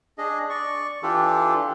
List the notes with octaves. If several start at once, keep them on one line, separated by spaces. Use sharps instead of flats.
D4 G#4 D#5
D5 C#6
E3 D4 F4 G4 A4